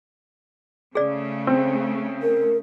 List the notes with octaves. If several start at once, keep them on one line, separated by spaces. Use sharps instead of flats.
C#3 A3 G#4 D5
C4
A#4